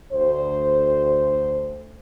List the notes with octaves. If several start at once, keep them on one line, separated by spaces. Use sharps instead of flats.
D2 C5